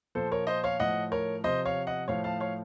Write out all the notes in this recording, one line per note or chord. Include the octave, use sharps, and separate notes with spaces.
A#2 F3 A4 C5
A#4 C#5
C5 D#5
C#5 F5
A2 F3 D#5 F#5
A#4 C#5
C3 F3 C5 D#5
C#5 F5
D#5 F#5
A2 F3 C#5 F5
F5 A5
C#5 F5